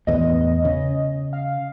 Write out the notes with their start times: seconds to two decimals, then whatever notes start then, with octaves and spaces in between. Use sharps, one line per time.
0.07 E2 A2 D#5
0.65 C#3
1.33 F5